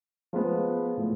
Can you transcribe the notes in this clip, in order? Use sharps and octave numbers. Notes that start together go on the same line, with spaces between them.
F3 G#3 B3
A2 F3